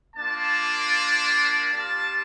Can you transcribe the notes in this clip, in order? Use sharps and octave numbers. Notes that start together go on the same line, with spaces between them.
A#3 D4 F4 A5
G3 D4 F4 A5